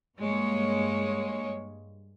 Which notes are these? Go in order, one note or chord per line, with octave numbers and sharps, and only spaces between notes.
G2 G#3 A#3 C#5